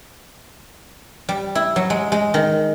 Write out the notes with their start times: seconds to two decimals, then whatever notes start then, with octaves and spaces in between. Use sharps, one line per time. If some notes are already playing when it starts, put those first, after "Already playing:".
1.29 G3
1.55 E4
1.76 F#3
1.90 G#3
2.12 G#3
2.34 D#3